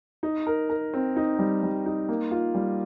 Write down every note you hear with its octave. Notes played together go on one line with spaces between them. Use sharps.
D#4
A#4
A#4
C4
D#4
G3
G3
D#4
A#3
F4
G3